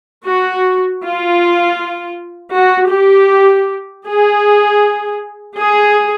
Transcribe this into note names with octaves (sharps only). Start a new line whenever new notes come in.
F#4
F4
F#4
G4
G#4
G#4